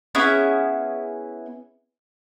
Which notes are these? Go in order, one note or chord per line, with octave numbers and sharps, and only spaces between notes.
B3 C#4 E4 G#4